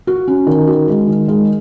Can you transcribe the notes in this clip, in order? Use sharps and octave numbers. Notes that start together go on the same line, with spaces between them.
F#4
C#4
D#3
F#4
G#3
D#3
G#3